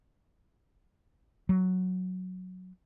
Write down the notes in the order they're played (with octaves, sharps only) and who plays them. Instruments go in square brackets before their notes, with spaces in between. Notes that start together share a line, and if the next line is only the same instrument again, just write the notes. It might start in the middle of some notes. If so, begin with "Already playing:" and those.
[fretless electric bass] F#3